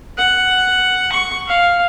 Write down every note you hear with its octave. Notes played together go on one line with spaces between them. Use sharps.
F#5
C#6
F5